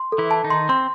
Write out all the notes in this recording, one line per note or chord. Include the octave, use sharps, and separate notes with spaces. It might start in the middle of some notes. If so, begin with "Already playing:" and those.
Already playing: C6
A4
E3 E4
A5
D#3 D#4
C6
C4 C6